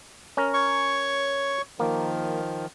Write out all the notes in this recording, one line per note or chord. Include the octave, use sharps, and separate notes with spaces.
C#4 A#4
C#5 C#6
D#3 F3 A#3